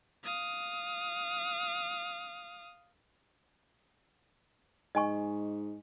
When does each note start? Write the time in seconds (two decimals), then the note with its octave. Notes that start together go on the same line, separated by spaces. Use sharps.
0.24 F5 D#6
4.95 G#2 D#5 G#5 C#6